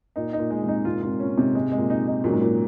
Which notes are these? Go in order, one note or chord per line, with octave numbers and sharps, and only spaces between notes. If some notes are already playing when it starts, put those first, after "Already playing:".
A#2 D#4
D#4
A#2
G#3
G#2 C3
D#4
G#2 C3 F4
G#2 C3 F4
A#2 C#4
G#2 C3
G#2 G#3
G#3
A#2
D#4
D#4
A#2 C#3 F#3
G#2
A#2 F#3